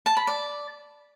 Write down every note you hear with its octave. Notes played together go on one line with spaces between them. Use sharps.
A5
B5
D5